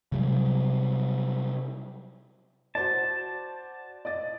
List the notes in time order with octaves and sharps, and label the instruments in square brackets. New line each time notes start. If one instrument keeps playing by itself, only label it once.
[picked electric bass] C3 F#3 G3
[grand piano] F#4 C5 D5 [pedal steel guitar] A5
[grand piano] D5 D#5 A6